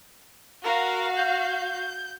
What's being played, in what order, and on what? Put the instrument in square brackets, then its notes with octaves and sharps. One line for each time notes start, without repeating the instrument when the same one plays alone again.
[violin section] F#4 F5 [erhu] A#4
[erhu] G6